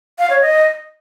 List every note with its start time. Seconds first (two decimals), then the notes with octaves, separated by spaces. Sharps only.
0.19 F5
0.30 C#5
0.42 D#5